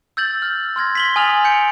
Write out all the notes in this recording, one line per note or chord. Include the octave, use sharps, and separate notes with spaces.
E6 G6 A6 F#7
F6
C6 F6 G#6 A#6
B6 F#7 G7
G#5 D#6 F6 A6 F7
G6 C#7 D7